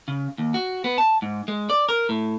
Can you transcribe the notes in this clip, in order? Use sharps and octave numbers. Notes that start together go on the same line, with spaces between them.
C#3
D#2
F#4
B3
A5
G#2
G#3
D5
A#4
A2